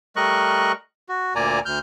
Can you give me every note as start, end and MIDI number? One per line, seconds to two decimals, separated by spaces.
0.16 0.72 55
0.16 0.72 57
0.16 0.72 70
0.16 0.72 75
0.16 0.72 85
0.16 0.72 90
1.09 1.34 66
1.35 1.60 38
1.35 1.60 46
1.35 1.60 58
1.35 1.60 74
1.35 1.60 80
1.35 1.60 82
1.65 1.79 38
1.65 1.79 89
1.65 1.79 91